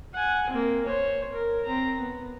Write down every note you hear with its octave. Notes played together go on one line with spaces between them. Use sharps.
F#5 G#5
A#3 C4
C5 C#5
A#4
C4 A#5
B3